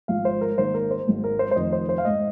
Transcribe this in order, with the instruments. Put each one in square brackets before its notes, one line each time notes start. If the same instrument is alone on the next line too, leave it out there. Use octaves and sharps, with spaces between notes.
[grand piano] G#1 G#2 F3 F5
C5
A#4
G#1 G#2 D#3 A#3 C5
A#4
C5
G#1 G#2 G#3
A#4
C5
C5
F1 F2 D#3 D#5
C5
C5
F5
G#2 G#3 D#5